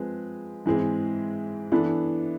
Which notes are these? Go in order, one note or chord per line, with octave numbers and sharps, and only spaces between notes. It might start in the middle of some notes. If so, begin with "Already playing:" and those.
Already playing: F3 G#3 C4 G#4 B4
G#2 E3 G#3 C4 G#4
E3 B3 D4 A4